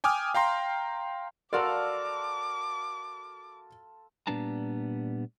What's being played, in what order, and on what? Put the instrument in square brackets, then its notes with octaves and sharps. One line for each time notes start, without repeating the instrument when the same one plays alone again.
[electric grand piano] G5 G#5 D6 D#6 F6
F5 G5 A#5 C6
[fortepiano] F#4 A#4 [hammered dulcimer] A4 F5 C6 [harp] D5 [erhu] D6
[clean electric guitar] A#2 G3 B3 D4 A5 A#5